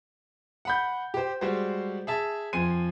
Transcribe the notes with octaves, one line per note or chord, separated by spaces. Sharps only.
F#5 B5 G6
G4 C5
G3 G#3 F#4 C5
G#4 E5 A5
F2 F3 G#5 C6 D#7